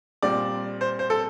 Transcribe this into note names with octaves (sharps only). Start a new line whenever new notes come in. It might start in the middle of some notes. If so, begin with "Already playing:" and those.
A#2 G3 C4 D5
C5
C5
A4